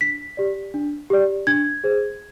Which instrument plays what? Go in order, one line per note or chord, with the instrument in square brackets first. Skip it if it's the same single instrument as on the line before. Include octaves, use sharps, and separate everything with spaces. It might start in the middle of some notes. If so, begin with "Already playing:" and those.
[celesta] D4 B6
G4 D5
D4
G4 D5
D4 G#6
G#4 C5